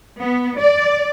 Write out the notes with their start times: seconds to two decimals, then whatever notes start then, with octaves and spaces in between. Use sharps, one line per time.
0.19 B3
0.59 D5